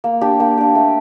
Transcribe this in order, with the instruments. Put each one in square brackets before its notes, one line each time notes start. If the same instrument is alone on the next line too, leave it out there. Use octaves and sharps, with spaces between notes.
[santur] A#3
D4 G4
A#3
D4 G4
A3